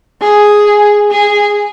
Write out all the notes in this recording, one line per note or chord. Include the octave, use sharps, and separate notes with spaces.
G#4
G#4